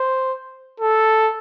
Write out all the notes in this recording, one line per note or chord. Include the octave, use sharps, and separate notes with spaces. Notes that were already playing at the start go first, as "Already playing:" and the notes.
Already playing: C5
A4